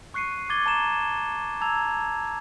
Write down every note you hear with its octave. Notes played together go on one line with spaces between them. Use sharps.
C#6 F#6 C7 C#7 D#7
D6 G#6 A6 G7
A5 A#5 E7
A5 A#5 E6 G#6 F7